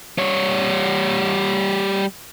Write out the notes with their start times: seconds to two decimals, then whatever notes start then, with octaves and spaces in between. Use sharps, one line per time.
0.18 G3 C#5